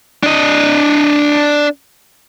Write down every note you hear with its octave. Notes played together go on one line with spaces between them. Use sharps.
D4 D#5